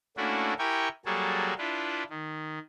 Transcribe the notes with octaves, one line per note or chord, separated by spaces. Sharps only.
A3 A#3 C#4 D4 E4 F#4
E4 G4 A#4 G5 G#5 C#6
F#3 G3 A#3 F#4 G#4 A4
D4 E4 F4 B4
D#3